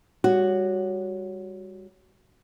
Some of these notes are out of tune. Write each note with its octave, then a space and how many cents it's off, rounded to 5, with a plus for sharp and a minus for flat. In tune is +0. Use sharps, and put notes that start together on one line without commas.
G3 +30 F#4 +0 C#5 +10